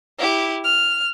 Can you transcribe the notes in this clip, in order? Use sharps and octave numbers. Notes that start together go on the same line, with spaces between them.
E4 G4
F6